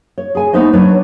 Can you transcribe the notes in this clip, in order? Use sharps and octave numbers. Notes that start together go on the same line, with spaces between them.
C#5
G#4 G#5
A3 B3 D#4 C5 D#5
F#3 A3 D4 B4 C#5